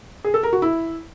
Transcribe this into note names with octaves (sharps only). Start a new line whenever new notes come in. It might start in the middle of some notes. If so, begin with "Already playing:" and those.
G#4
A4
A#4
F#4
E4